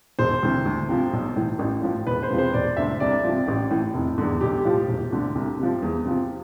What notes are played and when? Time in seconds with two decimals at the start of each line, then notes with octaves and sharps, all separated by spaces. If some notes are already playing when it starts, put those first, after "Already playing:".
0.19 E1 C5
0.42 D2 C3 E3
0.66 D2
0.89 C3 F3
1.13 B1
1.36 A2 E3
1.59 A1
1.83 A2 F3
2.07 E1 B4
2.23 C5
2.30 E2 C3 F3
2.38 C5
2.54 E1 D5
2.77 D2 D3 E5
3.00 C2 D5
3.24 F3
3.29 C3
3.48 A1
3.70 A2 E3
3.94 F1
4.18 E2 D3
4.41 B1 G4
4.65 A2 F3
4.88 E1
5.12 D2 D3
5.35 C2
5.59 C3 F3
5.82 E2
6.06 C3 F3